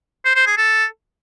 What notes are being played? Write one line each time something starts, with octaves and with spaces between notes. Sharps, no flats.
C5
C5
G#4
A4